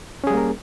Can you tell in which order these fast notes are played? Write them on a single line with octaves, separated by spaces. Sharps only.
C#4 G#4 G3 A#3 A#4